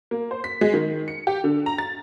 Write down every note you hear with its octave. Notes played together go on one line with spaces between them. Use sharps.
A#3
C5
B6
G#3
D#3
C#7
G4
D3
A#5
A6